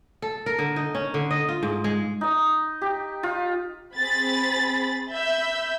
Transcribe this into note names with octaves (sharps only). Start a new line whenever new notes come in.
A4
A#4
D3
D#4
C#4
D3
D#5
F4
G#2
G#3
D#4 D#5
G4
F4
C4 G#4 B5 A6
E5 B5 E6 G6